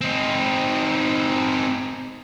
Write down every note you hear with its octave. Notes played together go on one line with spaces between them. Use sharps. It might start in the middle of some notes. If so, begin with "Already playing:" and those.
C4 D#4